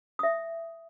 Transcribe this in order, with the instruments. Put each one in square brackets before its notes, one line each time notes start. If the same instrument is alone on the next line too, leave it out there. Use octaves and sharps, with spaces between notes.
[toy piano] E5 D#6